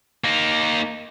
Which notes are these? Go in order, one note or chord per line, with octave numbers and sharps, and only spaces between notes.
A#3 D#4